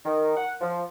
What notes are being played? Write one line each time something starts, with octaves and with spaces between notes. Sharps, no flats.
D#3
F#5
F3